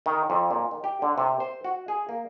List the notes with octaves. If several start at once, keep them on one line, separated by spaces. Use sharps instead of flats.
D#3
F2
A#2
D#3
G4
D3
C3
C5
F#4
G#4
A#3